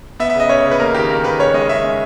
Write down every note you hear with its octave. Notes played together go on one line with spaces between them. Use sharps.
B3 E5
E5
C#3
D#5
C#3 C#5
C#3
B4
A#3 A#4
D#3 G4
A#3 A#4
D#3 B4
C#3 C#5
G#3 D#5
C#3 E5
G#3